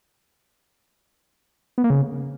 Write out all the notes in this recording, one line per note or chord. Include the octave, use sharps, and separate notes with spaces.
B3
A#3
C#3